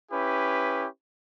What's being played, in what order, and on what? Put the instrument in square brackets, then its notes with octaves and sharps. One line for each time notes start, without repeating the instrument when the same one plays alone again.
[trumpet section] C#4 E4 G4 B4